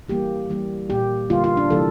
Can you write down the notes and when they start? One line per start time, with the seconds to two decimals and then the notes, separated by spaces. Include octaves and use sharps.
0.08 E3 G3 A#3 G4
0.50 E3 G3 A#3
0.90 A#2 G3 A#3 G4
1.30 D3 G3 A#3 F4
1.44 F4
1.57 D4
1.70 C3 E3 G3 A#3 A4